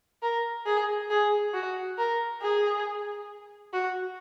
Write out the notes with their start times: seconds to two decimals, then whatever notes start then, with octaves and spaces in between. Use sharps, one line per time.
0.22 A#4
0.66 G#4
1.10 G#4
1.53 F#4
1.98 A#4
2.42 G#4
3.73 F#4